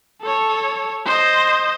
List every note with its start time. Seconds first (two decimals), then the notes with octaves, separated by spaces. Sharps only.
0.22 A4 C#5
1.06 C5 D#5